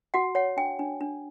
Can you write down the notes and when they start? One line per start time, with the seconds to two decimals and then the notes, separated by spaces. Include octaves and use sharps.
0.14 F#4 F#5
0.35 C#5 F#5
0.57 D4 G5
0.79 D4
1.01 D4